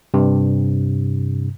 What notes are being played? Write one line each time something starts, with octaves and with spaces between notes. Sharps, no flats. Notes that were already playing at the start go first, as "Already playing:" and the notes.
G2 C3